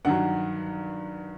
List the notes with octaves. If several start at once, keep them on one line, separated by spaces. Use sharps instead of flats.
G2 D#3 F#3 F#5